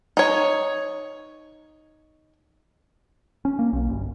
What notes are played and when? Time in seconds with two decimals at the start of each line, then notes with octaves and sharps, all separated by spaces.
0.17 D#4 C#5
3.45 C#4
3.59 A#3
3.73 B1
3.90 G1